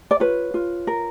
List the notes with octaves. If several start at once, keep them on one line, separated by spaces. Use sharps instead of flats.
D5
F4 B4 C#5
F4
A#4